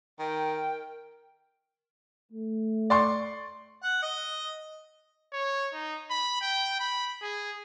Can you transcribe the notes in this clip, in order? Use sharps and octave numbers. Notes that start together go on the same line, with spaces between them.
D#3 A#4 G5
A3
D5 C6 C#6
F#5
D#5
C#5
D#4
B5
G5
B5
G#4